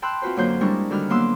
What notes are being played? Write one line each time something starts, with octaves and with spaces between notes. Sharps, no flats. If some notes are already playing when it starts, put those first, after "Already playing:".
G5 A5 B5 C6 E6 F#6
C4 F4 F#4 B4 C5
F#2 D3 F#3 A#3 C5 G6
G3 G#3 D4 E4 A#4 C#6
D3 D#3 G3 F#4 B5 F6
F#3 A#3 B3 C6 D6 E6